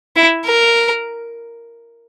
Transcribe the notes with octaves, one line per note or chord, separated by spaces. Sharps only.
E4
A#4